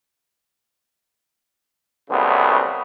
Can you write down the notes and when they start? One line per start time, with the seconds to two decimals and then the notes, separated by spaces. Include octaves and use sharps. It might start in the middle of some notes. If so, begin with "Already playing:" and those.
2.10 C2 F#2 A2 C#3 B3